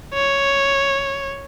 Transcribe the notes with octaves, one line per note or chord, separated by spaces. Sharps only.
C#5